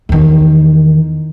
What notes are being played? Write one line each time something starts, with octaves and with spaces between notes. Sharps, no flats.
E2 D#3